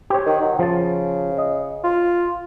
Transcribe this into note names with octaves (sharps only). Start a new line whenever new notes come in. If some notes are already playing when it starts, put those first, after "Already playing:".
G4 C5 C#5
D#3
F#3
C#3 F3 A5
D#5
F4